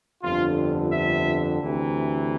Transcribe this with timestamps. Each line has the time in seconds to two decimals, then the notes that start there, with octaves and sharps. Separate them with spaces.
0.23 G1 F2 D3 F4
0.92 E5
1.61 D2 C3 E3